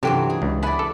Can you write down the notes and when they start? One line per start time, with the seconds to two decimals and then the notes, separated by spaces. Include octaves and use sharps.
0.03 G2 C3 E3 F#3 F4 A4 G5
0.30 G#4
0.42 C#2
0.63 D5 E5 F#5 G#5 B5
0.79 A4